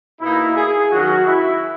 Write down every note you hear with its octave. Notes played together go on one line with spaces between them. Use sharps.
B2 A#3 D#4 E4
G#4
D#3 F#3 C#4 F#4
E4